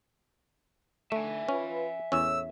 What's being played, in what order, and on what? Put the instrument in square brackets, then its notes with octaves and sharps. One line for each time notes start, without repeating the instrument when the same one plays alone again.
[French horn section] D3 [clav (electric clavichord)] A3 [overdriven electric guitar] E5 G#5
[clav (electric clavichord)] C#4 [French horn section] F4 B4
[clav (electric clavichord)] E2 C#4 [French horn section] A2 A3 C#5 [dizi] E6